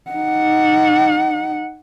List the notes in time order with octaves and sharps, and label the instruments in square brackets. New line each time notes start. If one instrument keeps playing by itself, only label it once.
[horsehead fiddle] D#4 F#5